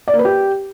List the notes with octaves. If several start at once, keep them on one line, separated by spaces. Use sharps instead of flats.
D5
A#3
B4
G4